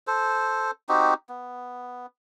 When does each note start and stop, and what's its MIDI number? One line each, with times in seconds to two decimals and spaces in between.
0.07 0.71 69
0.07 0.71 72
0.89 1.14 60
0.89 1.14 63
0.89 1.14 66
0.89 1.14 67
1.29 2.06 59